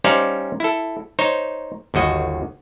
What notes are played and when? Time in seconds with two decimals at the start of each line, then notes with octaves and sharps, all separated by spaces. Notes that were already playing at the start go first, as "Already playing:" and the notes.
0.04 G3 C#4 D#4 C5 D5 F5
0.60 E4 A4
1.19 D#4 C5 C#5
1.94 G1 D#2 F#4 D#5